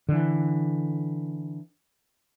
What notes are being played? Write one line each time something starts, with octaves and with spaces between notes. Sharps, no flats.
D3 E3